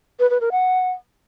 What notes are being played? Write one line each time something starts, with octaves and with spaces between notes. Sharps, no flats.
B4
B4
A#4
F#5